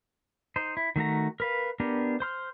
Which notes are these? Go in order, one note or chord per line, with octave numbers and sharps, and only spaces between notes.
D#4 C5
E4
D#3 A3 F#4 A#5
A#4 B4 F5
B3 D4 G4 A#4
C5 C6 F6